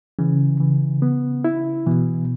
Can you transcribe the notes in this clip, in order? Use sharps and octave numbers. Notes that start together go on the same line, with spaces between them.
C#3 E3
E3
B3
E4
B2 E3